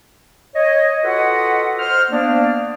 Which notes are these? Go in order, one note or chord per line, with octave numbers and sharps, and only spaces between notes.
C#5 D#5
F4 F#4 A4 B4 D#5 F#5
C5 F6
A#3 B3 D4